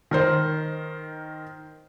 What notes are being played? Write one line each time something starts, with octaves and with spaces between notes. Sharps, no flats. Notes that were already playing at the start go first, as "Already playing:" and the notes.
D#3 A#4 C5